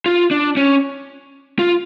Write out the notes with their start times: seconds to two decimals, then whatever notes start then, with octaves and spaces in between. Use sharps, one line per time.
0.06 F4
0.31 D4
0.57 C#4
1.59 F4